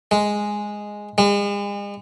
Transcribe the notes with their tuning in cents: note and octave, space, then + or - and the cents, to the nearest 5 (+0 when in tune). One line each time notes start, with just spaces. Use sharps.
G#3 +0
G#3 -40